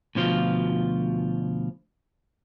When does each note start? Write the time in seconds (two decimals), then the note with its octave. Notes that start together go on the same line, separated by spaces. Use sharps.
0.15 D2 B2 F3 F4